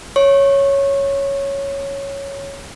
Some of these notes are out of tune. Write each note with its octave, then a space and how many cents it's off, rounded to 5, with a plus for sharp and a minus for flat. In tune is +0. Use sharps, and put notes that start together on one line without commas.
C#5 +0 C#6 -25